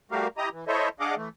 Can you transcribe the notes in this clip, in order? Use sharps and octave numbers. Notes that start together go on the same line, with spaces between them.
G3 A3 F#4 G4 A#4 F5
E4 G4 D#5 A#5 D#6
E3
E4 A4 C5 C#5 D#5 E5
D4 G#4 D#5 F5 F#5 D6
E3 A3